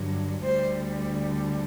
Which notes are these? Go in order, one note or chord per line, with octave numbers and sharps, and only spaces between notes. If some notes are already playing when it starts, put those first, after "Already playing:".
Already playing: G2 D3 F#3
D2 D3 G3 C5